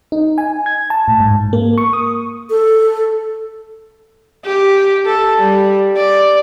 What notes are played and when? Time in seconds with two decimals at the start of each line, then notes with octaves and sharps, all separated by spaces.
0.12 D#4
0.38 G#5
0.66 G#6
0.90 A5
1.08 A2
1.20 G#2
1.53 A#3
1.78 C#6
1.93 D#6
2.50 A4
4.45 G4
5.06 A4
5.41 G3
5.97 D5